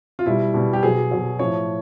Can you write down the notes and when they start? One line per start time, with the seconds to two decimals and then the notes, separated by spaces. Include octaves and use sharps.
0.19 F4
0.26 B2 G3 E4
0.54 B2 G3
0.73 G4
0.83 B2 F#3 G#4
1.11 B2 F#3
1.39 A2 F3 C#5